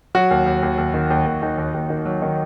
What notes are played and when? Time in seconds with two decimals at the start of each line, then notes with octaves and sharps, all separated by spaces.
0.15 F#3 F#4
0.31 D#2
0.46 D#2
0.62 D#2
0.78 D#2
0.94 D#3
1.10 D#2
1.26 D#2
1.42 D#2 D#4
1.58 D#2
1.74 D#2
1.90 D#3
2.05 F#3
2.22 D#3